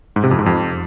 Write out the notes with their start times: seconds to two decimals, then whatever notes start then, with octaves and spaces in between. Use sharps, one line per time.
0.16 G#2
0.24 C3
0.31 F2
0.39 G#2
0.46 F2